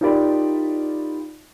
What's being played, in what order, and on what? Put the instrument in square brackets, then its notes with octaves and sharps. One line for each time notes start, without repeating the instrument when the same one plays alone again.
[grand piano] D#4 F4 G4 A#4 D5 B5